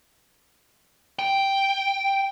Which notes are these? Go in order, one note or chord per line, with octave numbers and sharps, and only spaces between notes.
G5